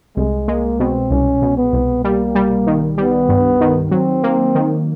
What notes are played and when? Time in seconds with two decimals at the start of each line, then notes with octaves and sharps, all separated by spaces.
0.17 C2 G#3
0.48 G#3 A#3
0.80 B2 C4
1.11 C2 C#4
1.42 B2
1.58 B3
1.73 C2
2.04 G3 A#3
2.35 G3
2.67 D#3
2.98 G3 B3
3.29 G2
3.61 D#3
3.91 F#3 C4
4.23 A#3
4.55 D#3